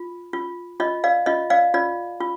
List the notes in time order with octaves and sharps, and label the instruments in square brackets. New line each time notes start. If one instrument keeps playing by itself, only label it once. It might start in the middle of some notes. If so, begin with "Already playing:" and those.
Already playing: [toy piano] F4
F4
F4 D#5
D5 F5
F4 D#5
D5 F5
F4 D5
F4